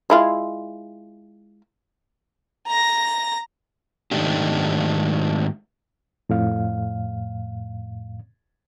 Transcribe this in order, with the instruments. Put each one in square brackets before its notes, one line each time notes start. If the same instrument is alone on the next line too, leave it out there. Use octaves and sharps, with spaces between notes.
[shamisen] G#3 E4 F4
[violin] A#5 A#6
[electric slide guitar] G#2 D#3 A3 D4 D#4 G4
[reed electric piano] F2 A2 F5